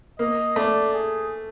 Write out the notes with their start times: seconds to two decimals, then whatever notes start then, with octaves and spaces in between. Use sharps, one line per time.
0.19 A#3 D#5
0.56 A3 D5
0.93 G#4